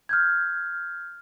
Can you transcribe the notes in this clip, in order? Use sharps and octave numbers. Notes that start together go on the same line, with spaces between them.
F6 G6 G#6